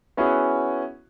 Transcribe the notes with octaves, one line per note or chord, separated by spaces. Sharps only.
B3 C#4 E4 F#4 G#4